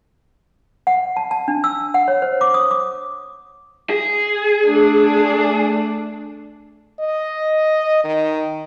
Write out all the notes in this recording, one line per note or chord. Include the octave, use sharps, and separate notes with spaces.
F#5
A5
A5
D4
E6
F#5
C#5
C5
D6
D#6
D6
G#4
A3 D4
D#5
D#3